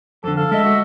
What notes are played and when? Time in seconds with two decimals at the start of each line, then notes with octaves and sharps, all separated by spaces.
0.24 F2 D3 A4
0.37 A4 F5
0.51 G#3 D#5 E5
0.64 F#4